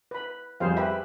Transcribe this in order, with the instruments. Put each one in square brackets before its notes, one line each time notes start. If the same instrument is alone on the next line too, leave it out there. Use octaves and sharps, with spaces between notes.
[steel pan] B4 B5
[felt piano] F2 G3 [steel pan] G#4 C5 F5
[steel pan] G4 B4 [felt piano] E5 B5